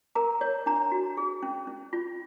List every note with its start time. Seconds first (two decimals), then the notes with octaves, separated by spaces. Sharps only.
0.15 A#4 A#5
0.41 C#5
0.66 D4 A#5
0.91 F#4
1.17 G#4
1.43 C#4
1.67 C#4
1.93 F4